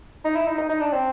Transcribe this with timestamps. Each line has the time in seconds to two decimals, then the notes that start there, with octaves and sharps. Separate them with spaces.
0.25 D#4
0.36 E4
0.48 D#4
0.58 D#4
0.69 D#4
0.80 D4
0.93 C4